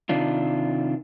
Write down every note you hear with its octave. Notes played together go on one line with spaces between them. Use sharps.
C3 D#3 D4 F4